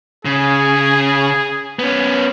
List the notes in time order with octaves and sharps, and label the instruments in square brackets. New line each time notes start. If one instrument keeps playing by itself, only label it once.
[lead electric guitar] C#3 [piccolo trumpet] G#4
[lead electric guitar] B3 C#4